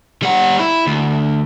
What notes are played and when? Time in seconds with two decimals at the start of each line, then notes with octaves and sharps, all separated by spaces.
0.23 G3 F#5
0.59 E4
0.87 D2